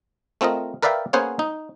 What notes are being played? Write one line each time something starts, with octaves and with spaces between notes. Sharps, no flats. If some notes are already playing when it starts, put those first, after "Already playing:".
A3 C4 F4 A#4 D#5
A#4 B4 D5 E5 F5 G5
A#3 B3 C#4 G#4 C5 F#5
D#4